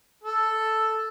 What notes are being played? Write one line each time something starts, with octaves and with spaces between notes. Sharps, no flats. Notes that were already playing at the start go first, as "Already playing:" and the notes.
A4